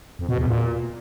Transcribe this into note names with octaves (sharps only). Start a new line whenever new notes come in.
F2
B2
E2
A#2